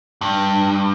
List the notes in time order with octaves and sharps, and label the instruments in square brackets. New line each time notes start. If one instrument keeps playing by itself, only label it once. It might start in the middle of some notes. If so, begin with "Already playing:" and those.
[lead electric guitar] G2